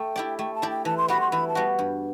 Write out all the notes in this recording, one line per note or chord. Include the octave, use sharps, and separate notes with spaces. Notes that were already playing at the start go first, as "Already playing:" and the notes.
Already playing: A3 A4 G5
E4 G4 D5
A3 G5
A5
E4 G4 D5
G5
E3 A5
C6
G3 B3 F#4 B5
C6
E3 B5
A5
G3 B3 F#4
G2